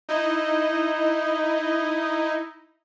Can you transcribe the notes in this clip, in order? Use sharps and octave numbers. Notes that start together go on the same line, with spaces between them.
D#4 E4 D#5